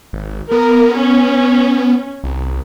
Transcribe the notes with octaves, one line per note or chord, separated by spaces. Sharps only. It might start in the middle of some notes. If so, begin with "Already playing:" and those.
G#1
B3 A#4
C#4
C2